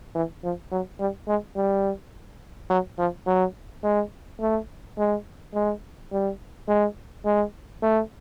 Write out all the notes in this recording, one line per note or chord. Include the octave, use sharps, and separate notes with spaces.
E3
F3
F#3
G3
G#3
G3
F#3
F3
F#3
G#3
A3
G#3
G#3
G3
G#3
G#3
A3